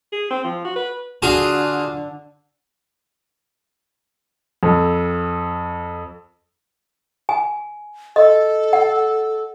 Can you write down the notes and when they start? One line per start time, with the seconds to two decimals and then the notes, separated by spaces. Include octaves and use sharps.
0.12 G#4
0.31 C4
0.44 F3
0.65 F#4
0.76 B4
1.22 D3 F4 F#4 G#4
4.63 F2
7.29 G#5
8.16 A4 D#5
8.73 F#5